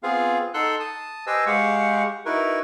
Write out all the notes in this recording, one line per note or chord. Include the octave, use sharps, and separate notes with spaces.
B3 C4 F4 G#4 F5
D#4 A4 F#5 C6 E6 F#6
A5 D#6
G4 B4 C5 D#5 G#5 E6
G#3 G4 F5 F#5 C#6
D#4 E4 F#4 A#4 B4